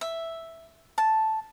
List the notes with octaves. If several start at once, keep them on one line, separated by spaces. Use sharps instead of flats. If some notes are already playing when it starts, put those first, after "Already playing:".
E5
A5